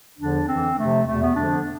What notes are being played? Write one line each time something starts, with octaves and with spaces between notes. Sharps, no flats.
E2 D3 F3 D4
F2 E3 C4
F2 C3 F3 A3
E2 B2 A3
B3
F2 D3 F3 D4